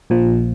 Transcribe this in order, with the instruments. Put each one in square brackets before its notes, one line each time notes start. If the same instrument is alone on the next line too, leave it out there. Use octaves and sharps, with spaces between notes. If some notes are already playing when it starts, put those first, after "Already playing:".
[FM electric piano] A#1 A#2 F3